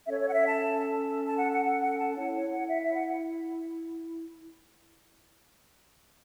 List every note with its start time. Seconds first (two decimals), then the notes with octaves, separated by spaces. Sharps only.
0.07 C#4 A4 C#5 E5
0.20 C#5
0.27 F#5
0.33 E5
0.46 A5
1.25 A5
1.38 F#5
1.51 F#5
1.64 F#5
1.82 F#5
1.99 A5
2.12 A5
2.17 E4 C#5 F#5
2.34 C#5
2.51 F#5
2.69 E5
2.82 E5
2.94 F#5